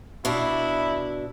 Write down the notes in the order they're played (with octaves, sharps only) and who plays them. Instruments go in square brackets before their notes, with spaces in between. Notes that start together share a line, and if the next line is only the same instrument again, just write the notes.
[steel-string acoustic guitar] B2 D4 [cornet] E4